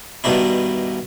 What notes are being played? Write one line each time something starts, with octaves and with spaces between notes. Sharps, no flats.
G2 B2 D#3 D4 E4